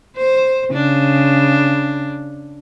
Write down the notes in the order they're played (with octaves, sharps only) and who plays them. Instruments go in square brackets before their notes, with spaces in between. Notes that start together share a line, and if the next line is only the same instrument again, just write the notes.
[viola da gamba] C5
C#3 D4